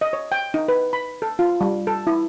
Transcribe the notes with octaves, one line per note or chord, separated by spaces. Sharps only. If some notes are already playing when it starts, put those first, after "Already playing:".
D#5
C#5
G5
D#4
B4
B5
A4
F4
G3
A4
E4